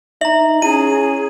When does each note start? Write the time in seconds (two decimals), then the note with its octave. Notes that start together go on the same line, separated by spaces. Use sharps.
0.21 D#4 E5 A#5 F#7
0.62 C#4 E4 G#4 D#7